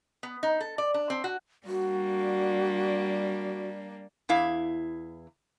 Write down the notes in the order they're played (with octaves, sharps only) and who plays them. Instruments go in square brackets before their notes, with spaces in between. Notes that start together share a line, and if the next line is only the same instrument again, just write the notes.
[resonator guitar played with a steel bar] B3
D#4
A4
D5
D4
C4
F#4
[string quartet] G3 A#3 D4 [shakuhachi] F#4
[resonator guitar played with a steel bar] E2 E4 F5